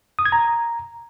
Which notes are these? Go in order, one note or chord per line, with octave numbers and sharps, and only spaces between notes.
D#6
G#6
A#5